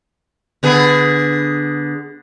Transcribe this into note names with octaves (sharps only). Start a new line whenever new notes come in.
D3 B3 G#4